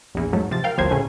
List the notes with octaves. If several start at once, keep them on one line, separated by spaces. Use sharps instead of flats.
A#1 E2
G#2 F#3 A3
C3 F3 A6
A#4 F5 G5
G1 D2 F3 F#3 C5 G#6
A2 C#3 C#4